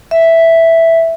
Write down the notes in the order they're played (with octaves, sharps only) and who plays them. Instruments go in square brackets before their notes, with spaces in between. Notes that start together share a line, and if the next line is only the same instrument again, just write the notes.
[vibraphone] E5